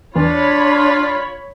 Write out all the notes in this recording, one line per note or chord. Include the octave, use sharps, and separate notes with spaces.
E2 D4 F4 C#5 B5